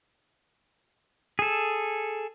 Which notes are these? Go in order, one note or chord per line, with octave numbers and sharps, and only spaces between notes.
G#4 A4